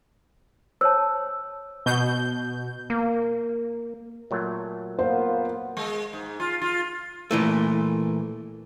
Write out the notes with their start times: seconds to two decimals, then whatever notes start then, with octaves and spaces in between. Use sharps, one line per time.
0.81 C5 C#5 A5 E6
1.86 B2 G6
2.90 A#3
4.31 A#2 F#3 A3
4.99 A#3 B3 F4 C5
5.77 G#3
6.13 G#2
6.40 F4
6.61 F4
7.31 A#2 E3 A3